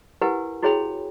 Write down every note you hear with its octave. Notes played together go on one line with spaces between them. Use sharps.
E4 G4 A#4 B4 F#5 G#5
E4 F#4 G#4 C#5 G5 B5